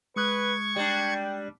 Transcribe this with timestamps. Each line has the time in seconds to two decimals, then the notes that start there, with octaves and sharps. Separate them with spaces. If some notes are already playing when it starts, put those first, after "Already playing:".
0.16 G#3 B4 C#6 D#6 F#6 G#6
0.76 G3 D4 G5